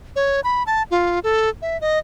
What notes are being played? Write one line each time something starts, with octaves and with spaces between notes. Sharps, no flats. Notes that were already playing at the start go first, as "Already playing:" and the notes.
C#5
B5
A5
F4
A4
E5
D#5